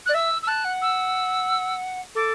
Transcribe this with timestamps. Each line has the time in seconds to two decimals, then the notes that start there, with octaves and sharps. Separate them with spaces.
0.06 F#6
0.09 D5
0.14 E5 E6
0.43 E6
0.47 A5 F#6
0.65 F#5
0.82 E6
2.15 A4 D6